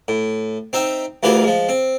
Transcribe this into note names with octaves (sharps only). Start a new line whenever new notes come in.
A2
C4 D#4 E5 G5
D2 E3 F4 G4 G#4 A#4
F3 G#3
C4